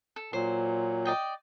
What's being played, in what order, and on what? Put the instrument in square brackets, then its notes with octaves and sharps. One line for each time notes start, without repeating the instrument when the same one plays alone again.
[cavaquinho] A4
[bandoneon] A#2 F#3 [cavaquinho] C5
[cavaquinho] D5 D#5 G5